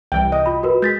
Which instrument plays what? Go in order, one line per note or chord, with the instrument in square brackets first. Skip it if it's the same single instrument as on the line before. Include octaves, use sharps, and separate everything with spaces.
[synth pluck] C2 E3 G3 [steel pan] G5
[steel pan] D#5
[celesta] F4 B5
F#4 A#4 B4
[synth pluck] G#3 [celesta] G6 A6 B6